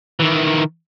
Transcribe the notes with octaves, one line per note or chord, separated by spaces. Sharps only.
D#3 E3